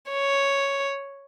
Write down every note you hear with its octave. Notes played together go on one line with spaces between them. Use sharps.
C#5